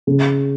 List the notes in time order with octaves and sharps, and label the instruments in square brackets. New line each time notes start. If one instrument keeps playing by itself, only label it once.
[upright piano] C#3